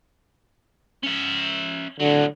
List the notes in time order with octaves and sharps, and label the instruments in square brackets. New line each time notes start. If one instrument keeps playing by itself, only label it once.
[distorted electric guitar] C#4 E5
[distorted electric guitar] A2 F#3 [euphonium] D3